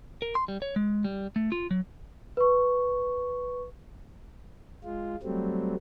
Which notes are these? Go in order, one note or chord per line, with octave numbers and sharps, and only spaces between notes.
A#4
C6
G3
C#5
G#3
G3
A3
F4
F#3
B4 C#6
G#3 F4
F#3 G3 A3 C4